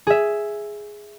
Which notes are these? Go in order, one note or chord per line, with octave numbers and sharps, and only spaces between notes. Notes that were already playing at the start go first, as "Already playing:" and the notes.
G#4 E5